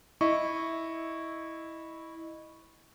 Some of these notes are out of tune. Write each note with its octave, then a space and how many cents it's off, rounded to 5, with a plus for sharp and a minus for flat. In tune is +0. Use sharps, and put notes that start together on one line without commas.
E4 -10 D#5 -15 C#6 +0